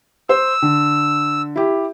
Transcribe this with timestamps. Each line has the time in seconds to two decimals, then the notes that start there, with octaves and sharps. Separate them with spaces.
0.29 C5 E6
0.62 D3
1.56 E4 G4